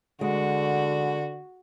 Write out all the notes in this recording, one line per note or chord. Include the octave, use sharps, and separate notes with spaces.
D3 G#3 F#4